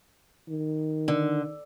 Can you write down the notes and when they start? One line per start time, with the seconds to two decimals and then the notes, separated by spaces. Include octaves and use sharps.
0.49 D#3
1.08 D3